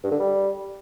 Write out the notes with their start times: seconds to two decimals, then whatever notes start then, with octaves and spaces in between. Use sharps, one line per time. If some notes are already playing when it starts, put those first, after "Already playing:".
0.04 G2
0.12 D3
0.19 G3